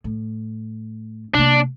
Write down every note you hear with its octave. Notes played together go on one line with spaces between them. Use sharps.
A2
C3 A#3 D4